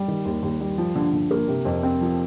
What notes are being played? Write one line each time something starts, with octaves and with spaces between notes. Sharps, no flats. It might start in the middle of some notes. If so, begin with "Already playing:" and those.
Already playing: G3
D#3
D#2
D#2
G3
F3
D3
D3
A#3
C3
F2
C4
F3